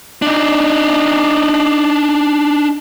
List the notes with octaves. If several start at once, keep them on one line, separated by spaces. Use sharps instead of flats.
D4 D#4